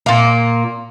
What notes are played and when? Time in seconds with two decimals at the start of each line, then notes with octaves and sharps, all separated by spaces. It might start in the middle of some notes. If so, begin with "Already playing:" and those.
0.06 A#2 A#3